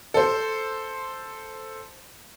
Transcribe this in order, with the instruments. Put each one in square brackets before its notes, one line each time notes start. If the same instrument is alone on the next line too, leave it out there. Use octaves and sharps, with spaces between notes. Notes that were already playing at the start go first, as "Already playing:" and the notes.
[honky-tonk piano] A4 C5